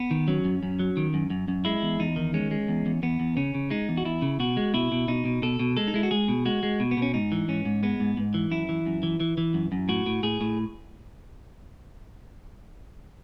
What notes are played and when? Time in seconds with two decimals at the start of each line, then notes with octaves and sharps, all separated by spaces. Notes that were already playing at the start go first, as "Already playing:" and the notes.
Already playing: B3
0.11 D#3
0.28 F#3 C#4
0.44 F#2
0.63 F#2
0.79 F#3
0.97 D#3
1.14 F#2
1.30 F#2
1.48 F#2
1.65 G#3 E4
1.83 E2
2.00 E2 D#4
2.16 D#3
2.34 G#3 C#4
2.51 G#3
2.68 E2
2.86 E2
3.03 E2 B3
3.20 E2
3.37 C#3 C#4
3.54 C#3
3.70 G#3 D#4
3.89 E2
3.97 F#4
4.05 E2 E4
4.22 C#3
4.40 B2 F#4
4.57 G#3
4.74 B2 E4
4.92 B2
5.08 B2 D#4
5.25 B2
5.42 B2 A4
5.60 B2
5.77 G#3 A4
5.88 D#4
5.94 G#3 E4
6.03 F#4
6.11 G#3 G#4
6.28 B2
6.45 G#3 F#4
6.63 G#3
6.80 B2
6.91 B3
6.97 B2
7.02 C#4
7.14 G#2 D#4
7.32 E3
7.48 G#2 C#4
7.65 G#2
7.83 G#3 B3
8.00 G#2
8.17 G#2
8.34 E3
8.51 F#2 E4
8.69 E3
8.86 F#2
9.03 E3
9.20 E3
9.38 E3
9.54 F#2
9.72 F#2
9.89 A2 F#4
10.06 A2
10.23 A2 G#4
10.41 A2